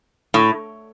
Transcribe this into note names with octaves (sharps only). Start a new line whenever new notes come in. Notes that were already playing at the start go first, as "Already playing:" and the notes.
A2